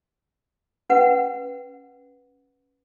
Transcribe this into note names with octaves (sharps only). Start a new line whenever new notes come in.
C#4 B4 F#5